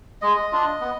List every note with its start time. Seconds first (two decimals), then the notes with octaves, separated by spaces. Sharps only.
0.22 G#3 D#5
0.52 D4 F4
0.81 B3